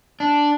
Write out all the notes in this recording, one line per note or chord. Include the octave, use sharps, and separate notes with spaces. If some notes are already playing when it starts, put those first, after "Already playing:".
D4